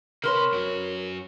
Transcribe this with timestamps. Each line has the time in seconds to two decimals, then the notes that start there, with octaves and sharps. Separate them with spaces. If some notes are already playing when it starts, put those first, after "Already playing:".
0.23 C3 A#4 B4 C#5 C6
0.52 F#2 F#4